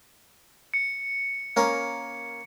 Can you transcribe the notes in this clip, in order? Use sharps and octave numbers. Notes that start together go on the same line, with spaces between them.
C#7
A#3 C#4 A#4